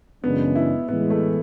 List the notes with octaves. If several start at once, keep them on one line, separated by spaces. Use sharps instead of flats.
F#2 C#3 E3 G#3 B3 D4
E4
A2 E3 G#3 B3
A3